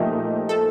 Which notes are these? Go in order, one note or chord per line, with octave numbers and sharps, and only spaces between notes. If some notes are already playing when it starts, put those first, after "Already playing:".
Already playing: A#2 F3 A3 D#4 G4
A4